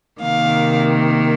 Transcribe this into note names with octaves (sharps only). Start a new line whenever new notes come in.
C3 D#3 A#3 F5